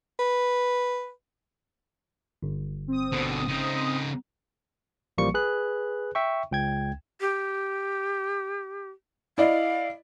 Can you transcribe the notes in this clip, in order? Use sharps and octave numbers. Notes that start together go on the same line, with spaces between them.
B4
G1
C4 D#6
B2 D3
C#3 D#4
A1 F3 G3 A#3 C#6 C#7
G#4 B4 F#6
E5 G5 C#6
C#2 G5 G#6
G4
E4 D5 D#5 F5